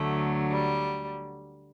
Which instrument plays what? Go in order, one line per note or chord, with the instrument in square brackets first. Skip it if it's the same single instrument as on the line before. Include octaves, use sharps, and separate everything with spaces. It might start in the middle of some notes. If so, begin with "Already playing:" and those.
Already playing: [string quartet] D2 D3 F#3 A3
G3